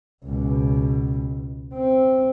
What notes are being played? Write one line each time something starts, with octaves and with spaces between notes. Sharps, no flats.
C#2 B2
C4